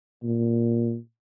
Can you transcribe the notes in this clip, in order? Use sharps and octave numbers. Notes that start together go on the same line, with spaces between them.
A#2